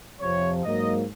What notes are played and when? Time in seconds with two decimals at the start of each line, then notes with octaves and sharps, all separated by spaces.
0.20 F2 C3 F3 C#5
0.64 G#2 F#3 A#3 D#5